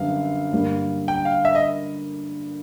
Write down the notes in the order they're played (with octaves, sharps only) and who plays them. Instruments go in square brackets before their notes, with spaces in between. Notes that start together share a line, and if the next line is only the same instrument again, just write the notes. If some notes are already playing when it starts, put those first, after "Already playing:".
Already playing: [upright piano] F#2 D3 G3 B3 D4 [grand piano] F5
[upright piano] G2 D3 G3 A#3
[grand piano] G5
F5
E5
D#5